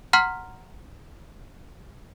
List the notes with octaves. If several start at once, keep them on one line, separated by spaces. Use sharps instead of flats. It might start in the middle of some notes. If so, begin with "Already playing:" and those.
F#5 A#5 C6 F6 B6